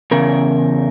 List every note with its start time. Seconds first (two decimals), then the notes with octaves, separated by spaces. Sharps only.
0.11 E2 C#3 A#4